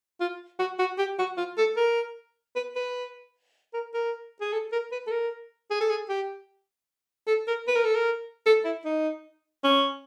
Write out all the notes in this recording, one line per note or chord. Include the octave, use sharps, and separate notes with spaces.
F4
F#4
F#4
G4
F#4
F4
A4
A#4
B4
B4
A#4
A#4
G#4
A4
A#4
B4
A4
A#4
G#4
A4
G#4
G4
A4
A#4
B4
A#4
A4
A#4
A4
E4
D#4
C#4